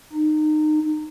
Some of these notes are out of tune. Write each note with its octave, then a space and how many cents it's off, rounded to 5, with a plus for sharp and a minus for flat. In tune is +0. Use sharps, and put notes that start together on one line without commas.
D#4 -25